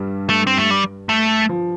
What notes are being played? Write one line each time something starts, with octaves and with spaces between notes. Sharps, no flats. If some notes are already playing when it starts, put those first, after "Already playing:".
Already playing: G2 G3
A3
C4
A3
G3
A3
F3